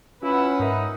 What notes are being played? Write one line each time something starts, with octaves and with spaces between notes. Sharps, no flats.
C#4 E4 F4 B4 F#5
G#2 D#4 A#4 E5